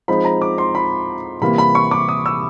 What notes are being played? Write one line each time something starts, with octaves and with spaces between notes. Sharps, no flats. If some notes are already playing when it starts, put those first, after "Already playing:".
F3 G#3 C4 D#4 B5
A#5
D6
C6
B5
C3 E3 G3 A#3 B5
B5
C#6
D6
D#6
E6